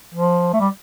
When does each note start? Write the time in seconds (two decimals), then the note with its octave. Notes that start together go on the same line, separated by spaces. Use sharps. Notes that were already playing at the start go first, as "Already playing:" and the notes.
0.15 F3
0.53 A3
0.60 G3